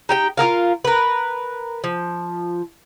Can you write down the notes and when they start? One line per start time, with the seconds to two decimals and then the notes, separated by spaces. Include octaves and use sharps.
0.09 D#4 G4 G5
0.37 F4 G#4 A#4 F5
0.85 A#4 B4
1.84 F3